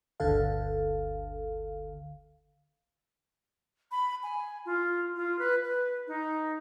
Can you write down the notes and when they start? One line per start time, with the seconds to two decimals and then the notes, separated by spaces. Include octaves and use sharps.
0.20 G1 D2 D3 A4 F5
3.91 B5
4.23 G#5
4.66 F4
5.16 F4
5.39 B4
5.64 B4
6.08 D#4